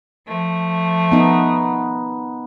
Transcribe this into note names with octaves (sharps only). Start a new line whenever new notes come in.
F3 A3
B3 D#4